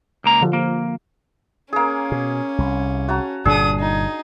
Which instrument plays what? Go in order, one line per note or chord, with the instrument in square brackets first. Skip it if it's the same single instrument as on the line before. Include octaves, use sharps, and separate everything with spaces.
[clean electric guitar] C#2 A#3 A#5
[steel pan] D3 F3
[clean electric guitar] A#3
[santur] A#3 G#4 [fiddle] C#4
[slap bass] B2
C2
[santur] F#4 A5 A#5
[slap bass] G1 A#2 G3 [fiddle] D4 D#6 [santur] G#4
[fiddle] D#4